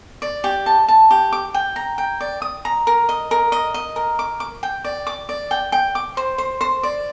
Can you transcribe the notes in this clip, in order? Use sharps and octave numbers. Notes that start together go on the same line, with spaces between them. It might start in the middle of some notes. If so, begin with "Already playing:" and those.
D5
G4
A5
A5
G4
D6
G5
A#5
G5
D5
D#6
A#5
A#4
D#5
A#4
D#5
D#5
A#4
D6
D6
G5
D5
D6
D5
G5
G5
D6
C5
C5
C5
D5